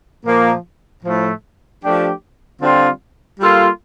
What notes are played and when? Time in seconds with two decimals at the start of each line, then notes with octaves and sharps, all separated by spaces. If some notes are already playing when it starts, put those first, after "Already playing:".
0.25 A#2 F3 A#3
1.03 A2 F3 A3
1.83 F3 A3 D4 G4
2.62 D3 G3 C4 F4
3.40 G3 A#3 F4 A4